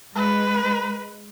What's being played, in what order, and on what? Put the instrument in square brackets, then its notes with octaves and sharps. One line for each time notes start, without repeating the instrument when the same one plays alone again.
[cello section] G#3 [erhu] B4